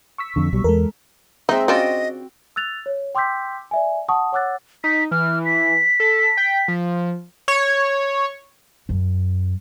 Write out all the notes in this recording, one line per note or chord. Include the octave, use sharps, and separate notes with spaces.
C#6 E6 B6
F2 D3
B1 B2 G3
E2 G#3 A4 A#4
G#3 C4 D#4 E5
C#3 D4 F4 F#4 D#5 G5
E6 F#6 A6 F7
C#5
G5 C6 D6 E6 G6 B6
D5 E5 G#5
F#5 A5 C#6 D#6
C#5 F#5 D6 E6 F#6 A6
D#4 B6
E3 F6
B6
A4
G5
F3
C#5
F#2